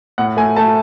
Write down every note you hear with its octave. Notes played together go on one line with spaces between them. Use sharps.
A2 F#5
A3 G#5
A3 A5